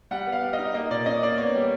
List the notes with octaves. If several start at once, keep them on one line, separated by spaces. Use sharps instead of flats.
G3 F#5
B3
F5
G3
D#5
D#4
A#3 D#5
A#2 D5
C#4 D#5
A#3 D5
B3 C#5
G3